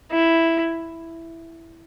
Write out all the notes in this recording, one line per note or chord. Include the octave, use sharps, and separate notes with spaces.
E4